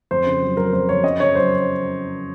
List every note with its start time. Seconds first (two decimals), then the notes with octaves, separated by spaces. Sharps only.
0.11 F2 C5
0.26 C#3
0.42 F#3
0.57 F#3 A#4
0.73 F2 C5
0.88 F#3 C#5
1.04 F#2 D#5
1.20 C#3 C#5
1.35 F#3 C5